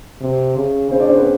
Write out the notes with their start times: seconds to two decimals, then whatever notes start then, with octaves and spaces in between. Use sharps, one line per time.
0.21 C3
0.57 C#3
0.91 C#3 C4 C5
1.00 D4 D5
1.09 C4 C5
1.17 B3 B4